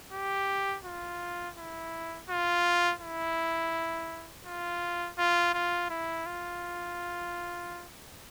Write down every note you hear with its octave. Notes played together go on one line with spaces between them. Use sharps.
G4
F4
E4
F4
E4
F4
F4
F4
E4
F4